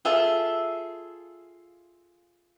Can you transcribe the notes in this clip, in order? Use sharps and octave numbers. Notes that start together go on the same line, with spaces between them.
F4 G#4 A4 E5